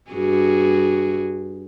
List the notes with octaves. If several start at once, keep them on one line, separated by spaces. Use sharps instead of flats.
G2 F#4 G#4